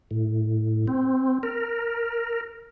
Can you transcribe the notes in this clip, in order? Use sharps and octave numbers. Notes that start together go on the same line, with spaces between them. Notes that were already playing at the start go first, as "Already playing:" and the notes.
A2
C4
A#4